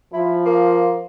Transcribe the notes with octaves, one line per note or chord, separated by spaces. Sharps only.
F3 E4
A#3